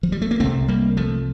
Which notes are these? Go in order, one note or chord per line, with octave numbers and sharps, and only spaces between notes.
F3
G3
A3
A#3
C2 C3 A3 C4
G3 A#3
F3 A3